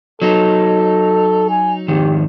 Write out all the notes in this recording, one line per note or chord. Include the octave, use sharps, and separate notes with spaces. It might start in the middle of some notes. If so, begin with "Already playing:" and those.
F#3 D#4 A4
G#5
F2 G#2 D#3 G4